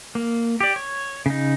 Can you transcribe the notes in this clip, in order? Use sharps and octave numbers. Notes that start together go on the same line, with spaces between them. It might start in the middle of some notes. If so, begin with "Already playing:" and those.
A#3
G4 D5
C#5
C#3 D#4